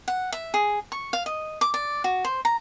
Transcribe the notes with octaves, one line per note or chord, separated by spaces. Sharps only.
F#5
E5
G#4
C#6
F5
D#5
D6
D5
F#4
C5
A#5